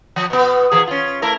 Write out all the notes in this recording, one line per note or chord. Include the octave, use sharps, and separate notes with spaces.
F3
B2 B3
B2 E3 G#4
C#4 F4
A3 E4 A#4